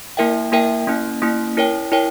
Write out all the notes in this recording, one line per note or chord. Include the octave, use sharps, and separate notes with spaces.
A#3 E4 A#4 E5 G5
A#3 E4 A#4 E5 G5
A#3 C#4 E4
A#3 C#4 E4
E4 A#4 C#5 G5
E4 A#4 C#5 G5